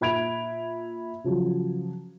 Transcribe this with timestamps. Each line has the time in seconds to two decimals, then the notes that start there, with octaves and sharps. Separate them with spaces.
0.01 A#2 E5 B5 G#6 D7 F7
1.24 C#3 F3 F#3